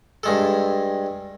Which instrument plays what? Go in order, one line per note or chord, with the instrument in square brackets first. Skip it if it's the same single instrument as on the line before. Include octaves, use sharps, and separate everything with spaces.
[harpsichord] G2 G#3 A4